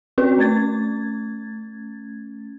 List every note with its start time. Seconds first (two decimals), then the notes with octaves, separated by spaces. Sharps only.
0.18 C4 C#4 F#4 B4
0.39 A3 C#4 G#6 A6